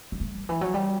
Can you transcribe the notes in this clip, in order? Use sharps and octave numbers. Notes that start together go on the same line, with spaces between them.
G3
A3
D#3
E3
F#3
G3